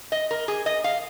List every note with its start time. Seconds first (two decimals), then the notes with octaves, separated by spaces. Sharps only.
0.12 D#5
0.31 A#4
0.48 G#4
0.66 D#5
0.84 F5